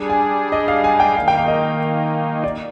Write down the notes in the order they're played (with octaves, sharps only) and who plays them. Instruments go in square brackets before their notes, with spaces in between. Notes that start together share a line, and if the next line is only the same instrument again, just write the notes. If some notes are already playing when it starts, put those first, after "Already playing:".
Already playing: [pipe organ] G3 D4 G#4
[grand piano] G#5
D#5
F5
G#5
G5
[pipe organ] D#3 A#3 D#4 [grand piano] F5
[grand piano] G5
F5
D#5
D5